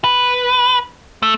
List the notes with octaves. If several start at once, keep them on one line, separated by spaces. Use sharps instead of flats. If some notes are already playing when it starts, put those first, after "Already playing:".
B4
A3